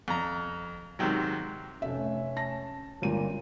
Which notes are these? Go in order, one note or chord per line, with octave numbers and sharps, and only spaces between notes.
F2 A#5
G#2 C3 D#3 F#3
F1 A3 C#4 E5
A5 A#6
G1 C#2 A#2 D#7